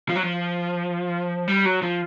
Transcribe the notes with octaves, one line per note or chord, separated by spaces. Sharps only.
F3
F#3
F3
G3
F#3
F3